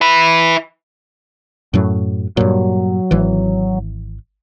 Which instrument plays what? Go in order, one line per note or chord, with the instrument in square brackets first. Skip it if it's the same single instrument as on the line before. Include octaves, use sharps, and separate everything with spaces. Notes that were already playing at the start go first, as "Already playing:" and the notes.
[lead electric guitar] E4 B4
[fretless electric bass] F#2 A2 F#3
[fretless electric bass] G2 A#2 [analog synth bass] F#3
[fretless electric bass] G#1 E3